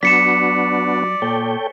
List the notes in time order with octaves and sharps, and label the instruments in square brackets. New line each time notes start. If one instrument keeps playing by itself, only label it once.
[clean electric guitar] F#3 [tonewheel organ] B3 D4 F#4 [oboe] D5 [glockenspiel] B6 C#7 E7
[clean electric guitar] A#2 [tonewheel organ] A4 C#5 G5